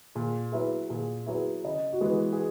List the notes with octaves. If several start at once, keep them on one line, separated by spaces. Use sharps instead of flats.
A#2 G#4
F#3 B3 E4 G#4
A#2 G#4
F#3 B3 E4 G#4
C#3 D#5
F#4
E3 G#3 B3 G#4
G#4